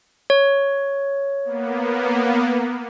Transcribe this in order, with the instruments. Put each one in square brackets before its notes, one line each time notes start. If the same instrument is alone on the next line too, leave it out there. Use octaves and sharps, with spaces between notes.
[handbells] C#5
[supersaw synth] A#3 B3